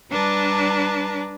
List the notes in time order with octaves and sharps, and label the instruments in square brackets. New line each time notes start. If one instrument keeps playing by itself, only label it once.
[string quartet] G3 D4 B4 A5 A#5